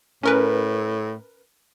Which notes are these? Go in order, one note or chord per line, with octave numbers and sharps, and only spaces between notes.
A2 C#4 A#4 B4